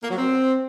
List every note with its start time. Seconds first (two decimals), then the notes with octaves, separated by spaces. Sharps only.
0.03 A#3
0.10 F#3
0.17 C4